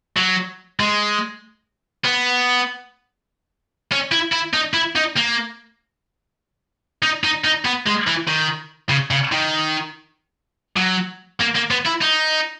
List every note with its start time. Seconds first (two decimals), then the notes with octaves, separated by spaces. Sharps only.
0.17 F#3
0.80 G#3
2.04 B3
3.92 C#4
4.12 E4
4.33 E4
4.54 D#4
4.74 E4
4.95 D#4
5.16 A#3
7.02 D#4
7.24 D#4
7.44 D#4
7.65 B3
7.86 G#3
8.07 E3
8.28 D#3
8.89 C#3
9.11 C#3
9.32 D#3
10.77 F#3
11.40 A#3
11.55 A#3
11.71 B3
11.86 E4
12.02 D#4